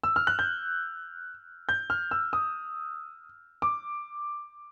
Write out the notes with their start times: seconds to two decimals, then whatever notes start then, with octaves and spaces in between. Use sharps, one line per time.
0.04 E6
0.16 F6
0.27 F#6
0.39 G6
1.69 G6
1.90 F6
2.11 E6
2.33 D#6
3.62 D6